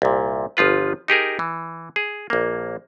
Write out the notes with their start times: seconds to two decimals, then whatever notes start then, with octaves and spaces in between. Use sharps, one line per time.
0.02 C2 A#2
0.57 G1 F3 F4 B4
1.08 D#4 G4 G#4 A#4
1.39 E3
1.96 G#4
2.30 A#1 A#3